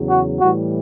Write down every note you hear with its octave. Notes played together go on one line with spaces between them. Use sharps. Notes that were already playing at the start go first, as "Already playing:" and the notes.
Already playing: E2 C#3 F#3
F#4
A2 E3 G3 F#4